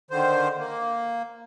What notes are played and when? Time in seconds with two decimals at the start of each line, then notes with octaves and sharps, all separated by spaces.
0.11 D3 D#3 C5
0.57 A#3